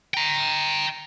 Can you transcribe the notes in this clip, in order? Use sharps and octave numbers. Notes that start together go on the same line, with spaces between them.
G5 A#5